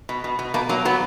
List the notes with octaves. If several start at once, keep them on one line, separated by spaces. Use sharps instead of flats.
B2
B2
B2
B2 A#3
F#3 A#3
F#3 B3